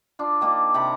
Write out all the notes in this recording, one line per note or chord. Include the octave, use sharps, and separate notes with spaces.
D4 F4
D#3 A#3 D4 F4
C3 A#5 B5